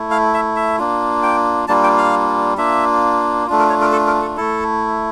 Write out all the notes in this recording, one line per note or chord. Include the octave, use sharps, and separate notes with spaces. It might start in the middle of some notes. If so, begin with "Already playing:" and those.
Already playing: A3 E4
F5
E5
E5
A#3 D4 F4
G5
G3 A#3 D4 F4 A5
G5
F5
A#3 D4 F4 E5
A3 D4 F4
A#4
C#5
A#4
A4
A#4
A4
A3 E4 A4